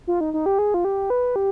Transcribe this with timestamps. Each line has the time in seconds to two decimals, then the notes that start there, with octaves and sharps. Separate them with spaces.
0.07 F4
0.21 D#4
0.34 D#4
0.46 G4
0.59 G#4
0.74 F4
0.85 G4
1.10 B4
1.36 G4